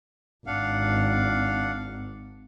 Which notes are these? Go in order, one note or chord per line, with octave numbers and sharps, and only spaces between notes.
G#1 D4 F5 F#5